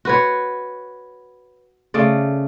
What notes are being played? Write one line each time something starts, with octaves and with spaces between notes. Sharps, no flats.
F#4 B4 C#5
C#3 A3 D5